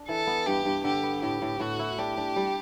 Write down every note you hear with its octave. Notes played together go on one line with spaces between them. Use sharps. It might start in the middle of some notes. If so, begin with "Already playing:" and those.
Already playing: D4
E3 A4
B3
G2 G4
G2
D3 G4
B3
A2 G4
A2
A2 F#4
E4
D4 G4
D4
G3